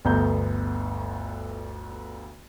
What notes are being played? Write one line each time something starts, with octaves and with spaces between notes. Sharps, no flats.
G1 D2 B3 A#5 G6